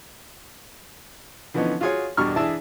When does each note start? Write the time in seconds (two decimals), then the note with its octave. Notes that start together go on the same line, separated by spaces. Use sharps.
1.54 D3 E3 F3 B3 C#4 D#4
1.81 F4 F#4 G#4 C#5 F5
2.17 E2 G2 B2 G3 C#6 F6
2.36 E3 D4 G#4 D5 E5 A5